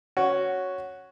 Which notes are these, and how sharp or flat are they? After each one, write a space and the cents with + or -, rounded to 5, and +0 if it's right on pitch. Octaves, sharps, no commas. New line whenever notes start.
C#4 +0 F#4 +0